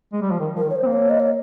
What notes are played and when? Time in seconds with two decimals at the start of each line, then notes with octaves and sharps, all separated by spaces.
0.13 G#3
0.22 G3
0.32 F3
0.40 D#3
0.56 F3 A#4
0.63 D#3
0.70 C#5
0.75 C5
0.83 C4
0.87 A#3
0.92 C#5
1.10 D#5
1.20 C#5